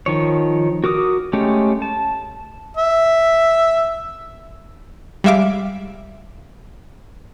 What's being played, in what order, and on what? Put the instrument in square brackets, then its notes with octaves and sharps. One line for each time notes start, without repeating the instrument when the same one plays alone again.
[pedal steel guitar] D#3 F3 C#5
F#4 A#4 D6 D#6
G#3 A3 C#4 G4
A5
[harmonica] E5
[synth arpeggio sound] G3 G#3 E5 F5 D6